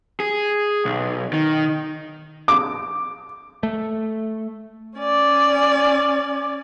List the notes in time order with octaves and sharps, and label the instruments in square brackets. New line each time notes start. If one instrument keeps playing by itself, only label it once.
[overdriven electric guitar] G#4
B1
D#3
[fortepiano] D6
[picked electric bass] A3
[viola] C#4 D5